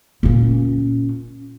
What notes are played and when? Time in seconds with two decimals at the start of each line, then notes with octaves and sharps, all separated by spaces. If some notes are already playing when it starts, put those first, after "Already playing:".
0.23 A#2 C#4